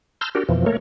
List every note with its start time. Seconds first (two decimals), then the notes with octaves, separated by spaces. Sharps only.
0.21 A5 A#5 C6 E6 F6 G6
0.35 D4 F#4 G4 A#4
0.49 F2 B2 E3 F3
0.66 A3 A#3 A#4 C#5